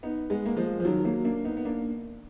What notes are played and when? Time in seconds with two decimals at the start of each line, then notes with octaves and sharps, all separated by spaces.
0.03 B3 D#4
0.30 G#3 B3
0.46 A#3
0.57 F3 G#3
0.80 F3
0.85 D#3 F#3
1.05 F#3 A#3
1.25 A#3 D4
1.45 B3 D#4
1.57 B3
1.65 A#3 D4